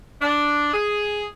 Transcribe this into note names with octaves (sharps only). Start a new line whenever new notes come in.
D4
G#4